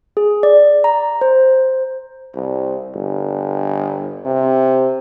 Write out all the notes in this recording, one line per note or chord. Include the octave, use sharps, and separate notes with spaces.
G#4
D5
A#5
C5
C2
G1
C3